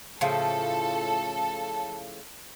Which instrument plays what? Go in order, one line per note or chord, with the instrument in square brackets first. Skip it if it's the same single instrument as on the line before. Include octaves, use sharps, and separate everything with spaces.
[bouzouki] A2 C#3 F3 [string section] A4